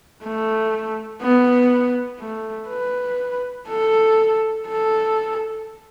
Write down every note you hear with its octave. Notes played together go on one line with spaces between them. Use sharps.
A3
B3
A3
B4
A4
A4